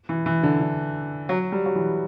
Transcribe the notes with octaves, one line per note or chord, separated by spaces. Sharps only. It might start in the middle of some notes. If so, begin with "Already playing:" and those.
E3
E3
D3
D3
F#3
G3
F#3
E3